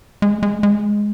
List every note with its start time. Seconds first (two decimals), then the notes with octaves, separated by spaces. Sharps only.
0.22 G#3
0.43 G#3
0.63 G#3